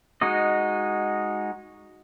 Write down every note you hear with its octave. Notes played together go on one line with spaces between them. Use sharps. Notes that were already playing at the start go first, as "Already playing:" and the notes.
G#3 D#4 F#4 D#5